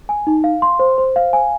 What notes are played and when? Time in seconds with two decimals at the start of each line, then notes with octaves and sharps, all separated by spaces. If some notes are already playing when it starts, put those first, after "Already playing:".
0.09 G#5
0.27 D#4
0.44 F5
0.62 C6
0.79 C5
0.98 C5
1.16 F5
1.33 G#5